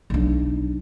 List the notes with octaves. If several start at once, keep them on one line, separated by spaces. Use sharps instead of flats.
B1 D4